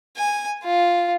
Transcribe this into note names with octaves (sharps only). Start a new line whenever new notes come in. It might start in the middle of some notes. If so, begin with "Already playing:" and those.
G#5
F4